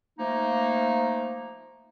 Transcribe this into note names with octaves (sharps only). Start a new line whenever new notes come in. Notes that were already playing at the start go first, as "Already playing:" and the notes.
F3 A3 A#3 D#4